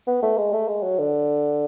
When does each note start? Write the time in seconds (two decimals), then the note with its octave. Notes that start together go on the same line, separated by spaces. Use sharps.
0.07 B3
0.22 A3
0.38 G#3
0.53 A3
0.68 G#3
0.83 F#3
0.98 D3